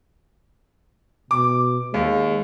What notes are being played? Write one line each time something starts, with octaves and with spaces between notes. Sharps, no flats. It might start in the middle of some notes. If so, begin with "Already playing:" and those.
B2 D6
D#2 G#3